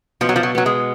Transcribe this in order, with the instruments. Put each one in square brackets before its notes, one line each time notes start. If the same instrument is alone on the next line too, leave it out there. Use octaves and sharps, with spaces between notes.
[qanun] B2 [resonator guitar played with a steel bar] F3
[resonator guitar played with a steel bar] F#3
F3
F#3
[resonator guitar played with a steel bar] F#3 [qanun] B3
[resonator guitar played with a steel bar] G#3